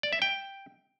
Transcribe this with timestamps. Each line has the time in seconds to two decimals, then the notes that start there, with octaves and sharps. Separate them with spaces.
0.03 D5
0.13 E5
0.22 G5